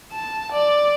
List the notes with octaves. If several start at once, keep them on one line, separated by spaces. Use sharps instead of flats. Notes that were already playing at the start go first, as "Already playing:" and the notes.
A5
D5